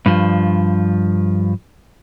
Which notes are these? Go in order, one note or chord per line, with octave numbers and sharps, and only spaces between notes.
G2 F3